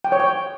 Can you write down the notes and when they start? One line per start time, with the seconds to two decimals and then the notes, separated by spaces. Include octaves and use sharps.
0.04 G5
0.12 C#5
0.20 G5